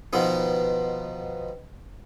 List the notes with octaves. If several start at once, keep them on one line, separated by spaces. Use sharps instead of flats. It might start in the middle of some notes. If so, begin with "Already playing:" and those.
B2 D#3 F3 B3 D#4